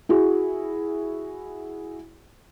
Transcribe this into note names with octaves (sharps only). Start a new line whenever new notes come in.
E4 F#4 G#4